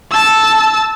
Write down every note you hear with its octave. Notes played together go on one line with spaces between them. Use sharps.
A5 E6